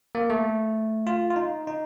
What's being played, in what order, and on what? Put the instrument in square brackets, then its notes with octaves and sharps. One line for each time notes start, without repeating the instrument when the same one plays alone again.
[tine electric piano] A#3
A3
F4
F4
D#4
D#4